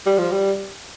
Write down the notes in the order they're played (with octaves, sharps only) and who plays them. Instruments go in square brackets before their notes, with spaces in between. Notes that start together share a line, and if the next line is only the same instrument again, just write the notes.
[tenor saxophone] G3
F3
G3